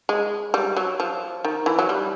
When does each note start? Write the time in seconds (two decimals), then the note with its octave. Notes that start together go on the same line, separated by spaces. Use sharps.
0.09 G#3
0.54 G3
0.77 F#3
1.00 F3
1.45 D#3
1.66 E3
1.79 F#3
1.89 G3